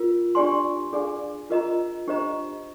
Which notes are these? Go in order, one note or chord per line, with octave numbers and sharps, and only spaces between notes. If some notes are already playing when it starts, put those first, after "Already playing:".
Already playing: F4 A#4
D4 G4 D5 G#5 C6
D4 G#4 D5 F5 G#5
F4 A#4 D#5 A#5
D4 G4 C5 D#5 A#5